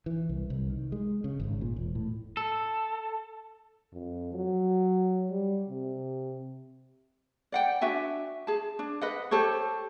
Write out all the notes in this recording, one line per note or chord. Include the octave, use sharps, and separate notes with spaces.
E3
C2
C2
D#3
G#3
C#3
G#1
A#2
E1
A2
A4
F2
F#3
G3
C3
D5 F#5 G5
D4 F#4 E5 G#5
G#4 A5
D4
B4 D#5 F#5
G4 A4 C5 C#5